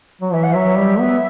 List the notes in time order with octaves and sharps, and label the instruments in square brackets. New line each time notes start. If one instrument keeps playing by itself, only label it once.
[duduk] F#3
[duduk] E3 [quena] E5
[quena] F#5
[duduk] F#3 [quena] E5
[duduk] G3
B3